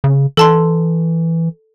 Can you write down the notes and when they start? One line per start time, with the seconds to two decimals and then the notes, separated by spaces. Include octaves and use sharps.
0.04 C#3
0.37 E3 A4 A5 C6